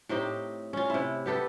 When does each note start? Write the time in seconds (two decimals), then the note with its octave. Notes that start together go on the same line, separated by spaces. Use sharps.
0.09 A2 C4 D#4 G4
0.73 C#4 F4
0.90 C3 E4
1.26 B3 G4 A4 B4